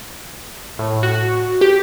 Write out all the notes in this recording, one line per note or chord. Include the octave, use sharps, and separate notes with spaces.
A2
F#4
G4